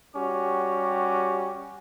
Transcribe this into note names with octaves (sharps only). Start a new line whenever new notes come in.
G3 C#4 F#4 G4 D6